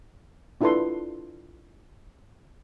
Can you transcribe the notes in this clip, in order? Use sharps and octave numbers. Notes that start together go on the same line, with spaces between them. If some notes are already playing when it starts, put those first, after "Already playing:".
D4 E4 F4 A4 B4 C6